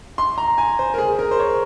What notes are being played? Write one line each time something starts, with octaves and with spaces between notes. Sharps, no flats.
C6
A#5
G#5
C5
A#4
G#4
A#4
C5
C#5